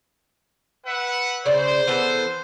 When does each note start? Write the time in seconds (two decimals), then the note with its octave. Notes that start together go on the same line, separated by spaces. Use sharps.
0.85 B4 E5 F#5
1.46 C#3 C5 D5
1.87 E3 B3 A4